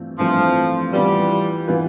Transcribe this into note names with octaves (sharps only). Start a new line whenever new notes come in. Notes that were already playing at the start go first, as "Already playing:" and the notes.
Already playing: G2 E3 A3 C4 F4
G2 E3 F3 A3 C4 F4
E3 G3 B3 F4 B4
E3 B3 F4 B4